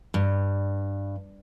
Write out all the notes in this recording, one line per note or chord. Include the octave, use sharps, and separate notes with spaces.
G2